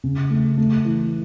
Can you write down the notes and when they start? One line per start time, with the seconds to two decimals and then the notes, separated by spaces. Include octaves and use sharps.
0.04 C#3
0.30 A3
0.58 A3
0.85 E3